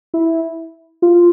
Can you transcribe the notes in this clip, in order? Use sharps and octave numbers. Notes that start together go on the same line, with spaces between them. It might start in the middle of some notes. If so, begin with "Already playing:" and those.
E4
F4